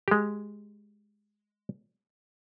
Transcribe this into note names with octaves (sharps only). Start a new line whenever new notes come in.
G#3 G4